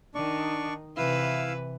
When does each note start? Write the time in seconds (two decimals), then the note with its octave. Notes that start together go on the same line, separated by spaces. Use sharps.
0.15 D#3 D4 D#4 D5 C#6
0.97 C3 E3 E4 B4 F5 E6